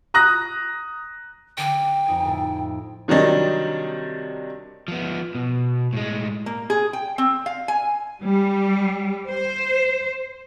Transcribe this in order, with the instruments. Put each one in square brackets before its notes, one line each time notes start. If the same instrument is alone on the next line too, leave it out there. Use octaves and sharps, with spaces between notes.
[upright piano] A#5 D#6 F#6 A#6
[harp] D3 D6 F#6 [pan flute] G5
[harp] F2 D#4 G#5
A2 A3
[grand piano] C3 D#3 F#3 G3 D4 D#4
[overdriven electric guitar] F3 B3
B2
A2 G#3
[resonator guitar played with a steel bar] A#3
G#4
G5
C4
F5
G#5
[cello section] G3
C5